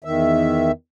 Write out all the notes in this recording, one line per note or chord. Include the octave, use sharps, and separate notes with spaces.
E2 D#3 E5